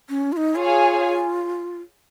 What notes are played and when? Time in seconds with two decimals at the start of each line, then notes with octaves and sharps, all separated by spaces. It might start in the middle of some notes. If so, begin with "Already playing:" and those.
0.09 C#4
0.32 F4
0.37 D#4
0.56 F4 G#4 C#5 F5 G#5